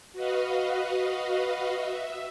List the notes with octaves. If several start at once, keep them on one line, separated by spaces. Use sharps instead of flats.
F#4 B4 D#5 F5
E5